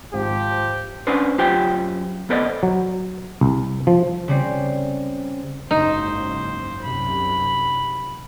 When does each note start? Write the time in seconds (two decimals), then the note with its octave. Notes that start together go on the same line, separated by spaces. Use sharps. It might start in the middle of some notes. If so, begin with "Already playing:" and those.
0.14 G#1 F3 G4
1.07 C#4 D4 B4 C5
1.38 F#2 F4 G4 C5 G5
2.30 B3 A4 B4 C5 D5 D#5
2.63 F#3
3.41 C2
3.87 F3
4.28 C#3 G3 C4
5.71 F#1 G#2 D#4 C5
6.83 C2 F#2 C3 B5